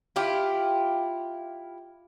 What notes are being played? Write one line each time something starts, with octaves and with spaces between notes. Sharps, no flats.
E4 F4 G4